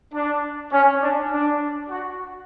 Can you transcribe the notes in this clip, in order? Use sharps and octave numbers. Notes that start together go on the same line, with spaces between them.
D4
C#4
D4
D4
F#4